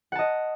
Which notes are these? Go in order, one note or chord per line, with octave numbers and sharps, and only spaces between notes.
D#5 F#5 A5